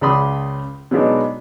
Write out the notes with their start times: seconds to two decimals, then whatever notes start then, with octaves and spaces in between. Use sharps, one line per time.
0.01 C#2 C#3 D5 B5 C6 D#6
0.91 B2 F#3 G#3 B3 D4 D#4